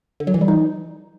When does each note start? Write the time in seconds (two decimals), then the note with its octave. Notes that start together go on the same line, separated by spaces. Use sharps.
0.20 D3
0.27 F#3
0.34 E3
0.41 G3
0.48 D#4